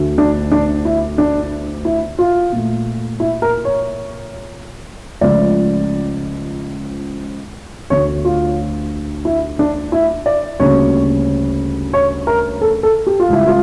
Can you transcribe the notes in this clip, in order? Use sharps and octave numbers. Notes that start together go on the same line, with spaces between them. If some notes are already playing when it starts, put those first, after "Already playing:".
Already playing: D2 D3 A3
D4
D4
E4
D4
E4
F4
A#2 A3
E4
A#4
C#5
C#2 C#3 F3 A3 D5
D2 D3 A3 C#5
F4
E4
D4
E4
D5
D2 C#3 G3 A#3 C#5
C#5
A#4
A4
A4
G4
F4
C#2 C#3 G3 E4
F4